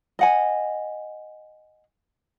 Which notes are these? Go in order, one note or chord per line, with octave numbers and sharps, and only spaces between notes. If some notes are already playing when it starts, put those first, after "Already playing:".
D#5 F#5 G#5